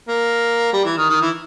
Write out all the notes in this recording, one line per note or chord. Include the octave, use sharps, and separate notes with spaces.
A#3
G3
E3
D#3
D#3
E3